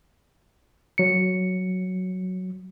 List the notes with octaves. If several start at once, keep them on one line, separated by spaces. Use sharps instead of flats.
F#3 C#7